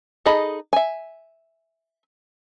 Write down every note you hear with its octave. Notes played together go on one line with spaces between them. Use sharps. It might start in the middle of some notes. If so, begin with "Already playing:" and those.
D#4 G#4 A4 D#5 B5
E5 G#5